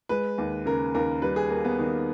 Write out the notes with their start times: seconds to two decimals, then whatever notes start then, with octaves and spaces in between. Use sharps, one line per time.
0.09 G#3 B4
0.38 D#2
0.66 C#3 A#4
0.94 D#2 A#4
1.22 G3 B4
1.36 G#4
1.50 A#3
1.65 B3
1.79 D#3